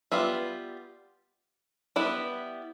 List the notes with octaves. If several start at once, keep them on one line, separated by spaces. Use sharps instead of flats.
G3 B3 F4 B4 E5
G3 B3 E4 B4